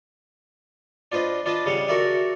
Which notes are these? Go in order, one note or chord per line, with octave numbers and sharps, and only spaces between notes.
D4 F4 B4 C5 D#5
D4 F4 B4 D#5 A5
C#3 G3 F5 F#5
F#4 A4 A#4 D5 E5